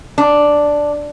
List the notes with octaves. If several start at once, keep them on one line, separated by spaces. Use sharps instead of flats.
D4